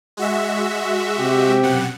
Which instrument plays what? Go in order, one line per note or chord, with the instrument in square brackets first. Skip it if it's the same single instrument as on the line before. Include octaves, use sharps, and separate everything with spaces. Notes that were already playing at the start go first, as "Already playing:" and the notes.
[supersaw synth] G#3 F#4 E5
[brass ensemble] C3 G4
[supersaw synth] F#2 B2 F#5